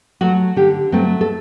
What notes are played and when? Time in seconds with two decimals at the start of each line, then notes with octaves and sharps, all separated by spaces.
0.21 F#3 A3 F#4
0.56 D3 G4
0.92 F#3 A3 C4
1.21 A4